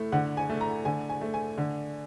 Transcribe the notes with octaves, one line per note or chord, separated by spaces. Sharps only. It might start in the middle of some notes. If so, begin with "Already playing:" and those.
Already playing: A2 A3
D3 F#5
G#5
A3
A#5
D3 G#5
G#5
A3
G#5
D3